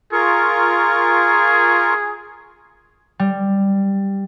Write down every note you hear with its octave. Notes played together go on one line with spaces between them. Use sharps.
F4 G#4 A#4 C#6
G3